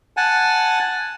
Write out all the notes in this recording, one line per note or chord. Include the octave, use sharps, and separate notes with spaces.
F#5 G#5 A5